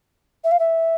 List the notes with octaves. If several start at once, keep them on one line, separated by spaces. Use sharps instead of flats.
E5
F5
E5